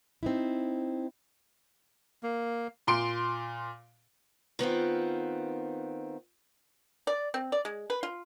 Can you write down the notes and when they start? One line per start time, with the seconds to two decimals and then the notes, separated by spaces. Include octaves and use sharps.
0.23 C4 D#4 E4
2.23 A#3
2.87 A#2 C6 D7
4.59 D#3 B3 C4 F4
7.07 D5
7.34 C4
7.52 D5
7.65 G#3
7.90 B4
8.03 F4